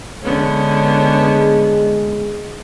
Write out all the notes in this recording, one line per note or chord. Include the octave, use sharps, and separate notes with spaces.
D3 G#3 B3 C#4